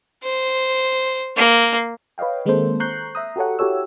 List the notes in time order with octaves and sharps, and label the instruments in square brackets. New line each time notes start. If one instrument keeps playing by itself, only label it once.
[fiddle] C5
A#3
[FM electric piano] B4 C#5 D#5 F5 G5
D#3 G#3 A#3 C4 A4 C5
A#5 C#6 F#6 G6 C7
E5 A#5 D#6
F#4 G4 A4 C#5 F#5
E4 F#4 G4 A4 C#5 E6